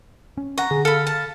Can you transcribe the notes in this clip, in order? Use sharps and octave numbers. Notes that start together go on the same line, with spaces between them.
C#4
F#5 A#5 C#6
D3 G#4
A4 F5 B5 F6
A5